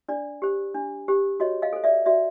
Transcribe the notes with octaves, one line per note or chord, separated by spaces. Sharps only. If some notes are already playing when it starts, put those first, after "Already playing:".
D4 D5
G4 C5
D4
G4 C5
F#4 C#5 D#5
D#5 F5
A4 C5
D5 E5
F#4 D5 E5